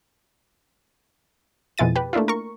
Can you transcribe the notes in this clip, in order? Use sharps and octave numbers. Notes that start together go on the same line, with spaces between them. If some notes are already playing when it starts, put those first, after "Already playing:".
F2 B2 G#3 E4 A6 D#7
G4 B4
A3 A#3 D4 E4 F4
A#4 C#6